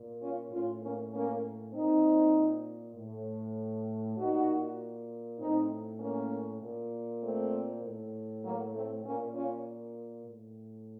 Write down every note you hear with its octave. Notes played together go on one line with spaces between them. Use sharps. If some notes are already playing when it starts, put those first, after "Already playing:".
Already playing: A#2
C#4 F4
A2 C#4 F4
A#3 C#4
A#3 C#4
A#2 C4 D#4
A2
A#2 D#4 F#4
A2 C4 D#4
A#3 C#4
A#2
A3 C4
A2
F#3 A#3
A3 C4
A#2 A#3 C#4
C#4 F4
A2